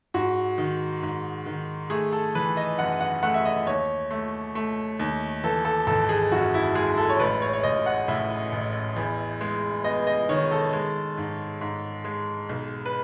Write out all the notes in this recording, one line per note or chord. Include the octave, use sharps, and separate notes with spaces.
G#2 F#4
D#3
G#2
D#3
A3 G#4
A4
E3 B4
D#5
F#2 F#5
F#5
A3 F#5
E5
D#5
D#2 C#5
A3
A3
D#2
E3 A4
A4
G#1 A4
G#4
F#2 F#4
E4
G#3 G#4
A4
C#5
A1 B4
C#5
C#5
A1 D#5
F#5
A2 E5
A1
E2
G#3
B3 D#5
D#5
D#3 C#5
A4
G#3
G#2
G#2
G#3
B1
B4